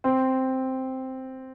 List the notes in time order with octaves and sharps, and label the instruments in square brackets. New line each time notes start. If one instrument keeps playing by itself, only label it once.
[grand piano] C4